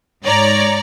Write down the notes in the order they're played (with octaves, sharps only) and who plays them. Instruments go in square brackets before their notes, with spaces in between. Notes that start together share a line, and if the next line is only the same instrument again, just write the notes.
[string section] G#2 C#5 D5 A#5